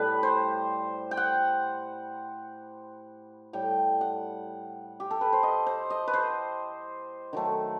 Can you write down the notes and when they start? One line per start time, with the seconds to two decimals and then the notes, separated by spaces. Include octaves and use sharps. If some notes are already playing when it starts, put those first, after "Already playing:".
Already playing: A2 G3 B4
0.23 C5
1.11 G5
1.17 F#5
3.53 A2 G3 G5
4.01 F#5
5.00 G4
5.11 A4
5.21 B4
5.33 C5
5.43 D#5
5.67 C5
5.90 D#5
6.08 B4
6.13 C5
7.33 D#3 F#3 A3